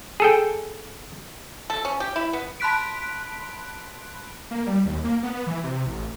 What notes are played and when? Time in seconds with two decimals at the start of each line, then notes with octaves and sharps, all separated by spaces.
0.20 G#4 A4 G5
1.70 A4
1.85 C#4
2.00 G4
2.16 E4
2.33 B3
2.60 A5 B5 C6 F#6 B6 D7
4.51 A#3
4.67 G3
4.85 D#2
5.04 A#3
5.23 B3
5.47 E3
5.64 C3
5.86 A1